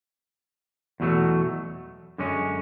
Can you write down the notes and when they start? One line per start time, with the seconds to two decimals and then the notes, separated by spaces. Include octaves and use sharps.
1.00 E2 B2 F#3 A3
2.18 F#2 D3 G#3 C#4